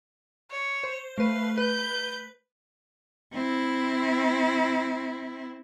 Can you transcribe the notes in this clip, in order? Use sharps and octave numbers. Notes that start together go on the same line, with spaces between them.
C#5
C5
A3 B4 F5
B4 G6
C4 E4